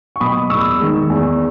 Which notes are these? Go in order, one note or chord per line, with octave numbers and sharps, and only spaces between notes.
C#6
B2 F#3 A#3 B5 D#6
E2 C#6 E6
D#3 G#3
E2